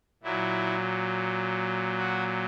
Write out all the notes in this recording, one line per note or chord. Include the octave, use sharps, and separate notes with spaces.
A#2 F#3 E4
F#4